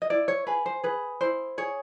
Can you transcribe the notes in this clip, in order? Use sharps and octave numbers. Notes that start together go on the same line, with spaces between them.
D#5
E4 D5
C#5
G#4 B4
C5
G#4 B4
E4 C5
G#4 C#5